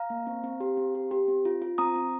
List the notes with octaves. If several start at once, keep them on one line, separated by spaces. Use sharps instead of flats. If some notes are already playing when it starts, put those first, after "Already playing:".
Already playing: F5 A#5
A#3
C4
C4
G4
C4
G4
G4
C4
F4
F4
C4 A#5 D#6
C4